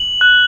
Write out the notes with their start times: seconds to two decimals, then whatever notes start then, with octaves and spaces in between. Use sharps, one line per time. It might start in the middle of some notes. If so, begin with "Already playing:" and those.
Already playing: F#7
0.21 F#6